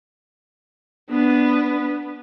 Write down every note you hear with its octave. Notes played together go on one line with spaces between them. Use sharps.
B3 D4 B4